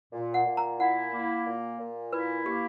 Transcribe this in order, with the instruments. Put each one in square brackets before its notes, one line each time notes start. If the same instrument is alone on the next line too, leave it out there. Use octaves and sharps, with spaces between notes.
[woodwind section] A#2
[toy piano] F#5
[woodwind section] A#2
[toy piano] A#5
[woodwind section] E4 [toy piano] F#5
[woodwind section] A#3
A#2
A#2
[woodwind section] E4 [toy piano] B4
[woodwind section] A#3 [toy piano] G4